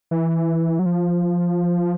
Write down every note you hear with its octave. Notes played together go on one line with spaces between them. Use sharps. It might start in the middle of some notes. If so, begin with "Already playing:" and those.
E3
F#3
F3